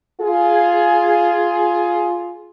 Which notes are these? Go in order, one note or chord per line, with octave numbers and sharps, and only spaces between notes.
F4 G#4